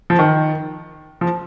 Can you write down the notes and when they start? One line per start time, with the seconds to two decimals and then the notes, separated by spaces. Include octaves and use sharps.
0.10 F3
0.19 D#3
1.21 F3